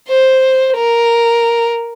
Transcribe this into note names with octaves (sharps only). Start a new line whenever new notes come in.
C5
A#4